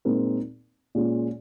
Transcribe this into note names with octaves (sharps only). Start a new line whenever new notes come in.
A#2 G#3 C4 D#4 A#4
A#2 G#3 C#4 F4